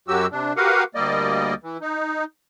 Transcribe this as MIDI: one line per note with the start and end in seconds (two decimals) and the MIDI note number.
0.08 0.26 42
0.08 0.26 54
0.08 0.26 66
0.08 0.26 67
0.08 0.26 88
0.32 0.53 48
0.32 0.53 62
0.57 0.84 66
0.57 0.84 67
0.57 0.84 70
0.57 0.84 71
0.57 0.84 77
0.57 0.84 78
0.95 1.54 38
0.95 1.54 55
0.95 1.54 58
0.95 1.54 74
0.95 1.54 75
1.63 1.77 52
1.81 2.24 63